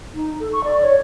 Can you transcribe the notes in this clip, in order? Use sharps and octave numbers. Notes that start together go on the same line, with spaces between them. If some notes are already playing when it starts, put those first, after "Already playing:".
D#4
A4
C#6
D5
C#5